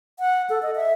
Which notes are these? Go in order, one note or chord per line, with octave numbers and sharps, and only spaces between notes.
F#5
A4
D#5
E5